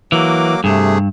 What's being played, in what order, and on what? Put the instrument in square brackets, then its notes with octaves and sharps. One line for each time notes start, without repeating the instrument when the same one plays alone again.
[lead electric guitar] E3 [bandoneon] F#3 A#3 D6
[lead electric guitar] G2 [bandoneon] C3 A3 G#4